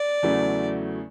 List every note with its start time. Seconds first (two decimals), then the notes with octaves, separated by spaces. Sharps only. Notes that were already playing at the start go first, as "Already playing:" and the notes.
Already playing: D5
0.23 E2 C#3 F#3 A3 E4